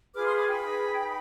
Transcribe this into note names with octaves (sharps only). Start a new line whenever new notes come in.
F4 G#4 B4 D6 F6
C6 D#6
B5 D6
G5 B5
D#4 G#4 B4
D#4